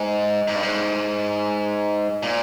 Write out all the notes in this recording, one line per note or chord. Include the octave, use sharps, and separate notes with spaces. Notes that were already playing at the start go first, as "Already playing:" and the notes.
Already playing: G#2
G#2
G2
G#2
A#2